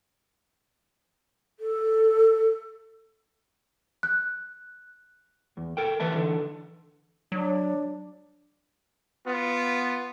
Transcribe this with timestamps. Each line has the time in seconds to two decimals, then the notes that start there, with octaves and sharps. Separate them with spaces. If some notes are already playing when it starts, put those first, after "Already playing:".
1.60 A4
4.03 F#6
5.57 E2
5.77 A4 A#4 G5
6.00 D2 E3 B4 E5 A5
6.14 D3 E3 A4
7.32 F#3 D4
9.27 B3 F4